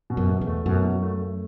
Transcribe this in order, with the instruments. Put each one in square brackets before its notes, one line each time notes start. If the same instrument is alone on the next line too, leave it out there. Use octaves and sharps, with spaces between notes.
[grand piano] B2
[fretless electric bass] F#2
[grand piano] B2
[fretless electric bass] E2
[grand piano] A3
[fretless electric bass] F#2 [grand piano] B2
[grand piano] F#3
A3
A3